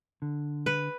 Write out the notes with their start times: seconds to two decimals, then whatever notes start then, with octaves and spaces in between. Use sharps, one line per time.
0.22 D3
0.66 B4